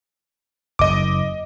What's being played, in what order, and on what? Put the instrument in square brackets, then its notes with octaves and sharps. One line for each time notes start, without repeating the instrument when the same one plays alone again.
[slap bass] F#1 F#2 [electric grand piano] D#5 D6